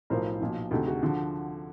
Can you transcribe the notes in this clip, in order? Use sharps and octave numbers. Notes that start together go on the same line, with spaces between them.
B1 A2 F3 A#4 C5
B1 A#2 F3
D2 C3 D#3 G4 A4
F#4 G#4
D3 F3